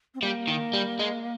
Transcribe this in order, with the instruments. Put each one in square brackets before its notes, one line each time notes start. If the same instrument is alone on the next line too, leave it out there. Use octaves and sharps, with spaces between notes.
[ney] C4
[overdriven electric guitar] G3 [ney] A#3
[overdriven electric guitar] D#3
G3
G#3